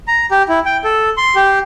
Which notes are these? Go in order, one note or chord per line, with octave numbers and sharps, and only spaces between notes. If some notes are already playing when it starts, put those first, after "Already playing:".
A#5
G4
E4
G5
A4
C6
G4